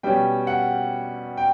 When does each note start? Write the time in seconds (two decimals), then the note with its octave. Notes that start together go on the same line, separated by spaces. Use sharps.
0.03 B2 G3 C#4 G5
0.47 F#5
1.37 G5